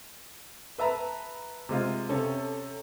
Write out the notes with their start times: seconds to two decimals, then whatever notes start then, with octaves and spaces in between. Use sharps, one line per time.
0.78 B4 E5 A5 A#5
1.69 C3 G#3 F4
2.09 C3 C#4 A4